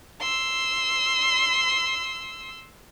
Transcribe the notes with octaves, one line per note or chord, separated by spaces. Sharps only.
C6 E6